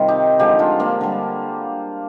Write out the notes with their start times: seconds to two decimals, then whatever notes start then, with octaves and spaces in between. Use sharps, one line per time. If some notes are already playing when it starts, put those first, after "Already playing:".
Already playing: C3 D#3 G3 F4
0.08 D#4 G4
0.39 D3 F3 G#3 D#4 G4
0.59 D4 F4
0.79 A#3 D4
1.01 D3 G3